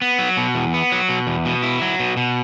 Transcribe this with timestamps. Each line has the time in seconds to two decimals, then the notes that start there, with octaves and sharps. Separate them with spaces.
0.02 B3
0.19 F#3
0.37 B2
0.55 E2
0.74 B3
0.92 F#3
1.09 B2
1.27 E2
1.45 B2
1.63 E4
1.82 F#3
2.00 B2
2.17 B2